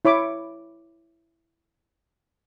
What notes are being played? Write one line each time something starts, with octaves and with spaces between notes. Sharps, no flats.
E4 C#5 B5 D6